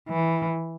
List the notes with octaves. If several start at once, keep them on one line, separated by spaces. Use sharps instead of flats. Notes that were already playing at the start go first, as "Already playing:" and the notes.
E3